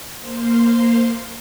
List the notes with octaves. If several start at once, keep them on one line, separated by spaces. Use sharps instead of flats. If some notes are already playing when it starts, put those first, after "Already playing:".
A#3 C5 F5 C6